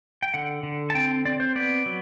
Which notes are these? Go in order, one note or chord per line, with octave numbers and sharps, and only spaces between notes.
G5
D3 F#5
D3
A5
C4 G5
C4 D5
C5
B3 D5
F#3